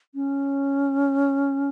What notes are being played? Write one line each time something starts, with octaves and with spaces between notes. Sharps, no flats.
C#4